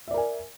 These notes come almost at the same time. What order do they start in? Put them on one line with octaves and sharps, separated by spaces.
E5 D5 A#4 G#5